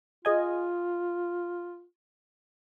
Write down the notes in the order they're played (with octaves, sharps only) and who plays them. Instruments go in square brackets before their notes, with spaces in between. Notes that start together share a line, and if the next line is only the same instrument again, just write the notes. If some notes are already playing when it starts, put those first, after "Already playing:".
[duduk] F4 [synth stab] G#4 D#5 G#5